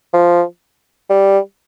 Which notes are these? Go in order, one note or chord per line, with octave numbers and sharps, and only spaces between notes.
F3
G3